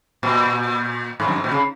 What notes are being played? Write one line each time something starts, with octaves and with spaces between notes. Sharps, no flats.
A#2
G#2
F#2
G#2
A#2
C#3